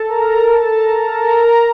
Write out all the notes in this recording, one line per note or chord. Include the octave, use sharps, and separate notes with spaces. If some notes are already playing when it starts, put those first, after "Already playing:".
Already playing: A4 A5
A#4 A#5
A4 A5
A#4 A#5
A4 A5
A#4 A#5
A#4 A#5
A#4 A#5